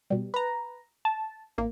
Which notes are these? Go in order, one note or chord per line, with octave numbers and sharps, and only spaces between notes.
B2 G3
B4 A#5
A5
A1 A#3